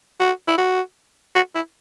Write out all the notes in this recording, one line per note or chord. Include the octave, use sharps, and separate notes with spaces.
F#4
E4
F#4
F#4
E4